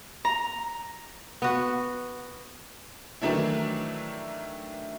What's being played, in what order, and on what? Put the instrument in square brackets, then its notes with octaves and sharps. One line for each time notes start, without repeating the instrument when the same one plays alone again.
[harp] A#5
[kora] B3 F#4
[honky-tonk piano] D#3 E3 F#3 A3 D4 E4